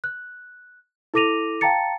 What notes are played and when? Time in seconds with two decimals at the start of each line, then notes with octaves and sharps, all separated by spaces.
0.04 F#6
1.14 E4 A4 D6 A#6 D#7 F7
1.61 F5 G5 A5 A#5 A6 C#7